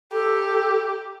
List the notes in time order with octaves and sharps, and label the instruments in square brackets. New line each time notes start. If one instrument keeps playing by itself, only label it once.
[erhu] G4 [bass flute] A4